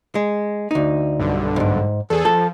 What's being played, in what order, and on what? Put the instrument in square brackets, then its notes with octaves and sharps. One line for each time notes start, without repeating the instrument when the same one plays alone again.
[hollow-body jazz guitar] G#3
D2 D#4
[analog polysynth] B1 G2 D3
[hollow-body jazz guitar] C2 G#2
[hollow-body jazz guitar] E2 [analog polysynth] G#4 A4
[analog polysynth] F3 [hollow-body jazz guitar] A4